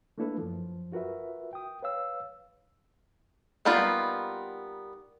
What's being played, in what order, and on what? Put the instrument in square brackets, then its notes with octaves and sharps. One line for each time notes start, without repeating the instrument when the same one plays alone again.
[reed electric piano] A3 A#3 D4 E4 A4 B4
F#2 F3
F4 F#4 A#4 B4 E5
G5 D#6
B4 C#5 F5 E6
[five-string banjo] G3 A#3 B3 D#4 F4